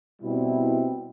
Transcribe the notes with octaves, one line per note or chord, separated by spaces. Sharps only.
B2 G3 C4 E4